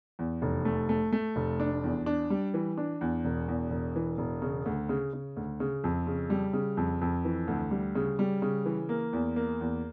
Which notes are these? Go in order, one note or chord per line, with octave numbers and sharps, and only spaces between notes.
E2
F1
A3
A3
A3
F1
D4
E2
D4
G3
E3
D4
E2
E1
E2
E1
E3
E1
C#3
D2
C#3
C#3
D2
C#3
F2
C#3
G3
C#3
F2
F2
E3
D2
G3
C#3
G3
C#3
E3
A#3
E2
A#3
E2